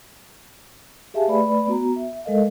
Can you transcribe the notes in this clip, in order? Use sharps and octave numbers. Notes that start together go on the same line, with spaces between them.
G4 G#4 E5 F5 G#5 A5
A3 B4 D5 B5
B3 F#4 A#5
E5
G#3 A4 A#4 D#5 F5